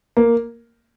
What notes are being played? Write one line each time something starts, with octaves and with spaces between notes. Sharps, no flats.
A#3